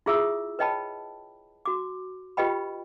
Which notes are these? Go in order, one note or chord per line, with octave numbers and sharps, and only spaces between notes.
E4 F4 G#4 E5 D#6 E6
B4 C#5 D#5 G5 A5 B5
F#4 D6
F4 G4 B4 D#5 G5 B5